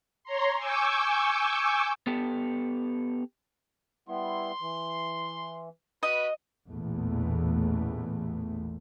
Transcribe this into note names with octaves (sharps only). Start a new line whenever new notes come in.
C#5 A#5 C6
G#5 C#6 D6 E6 G6
B3 G4 A4
G3 B3 E4 C6
E3
F#4 B4 D#5
A1 E2 A#2 A3